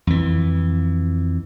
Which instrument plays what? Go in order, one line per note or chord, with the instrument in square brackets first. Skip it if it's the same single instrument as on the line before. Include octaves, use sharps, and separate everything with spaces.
[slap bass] F2 E3